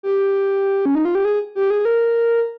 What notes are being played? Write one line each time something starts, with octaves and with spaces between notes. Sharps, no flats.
G4
C#4
D#4
F4
G4
G#4
G4
G#4
A#4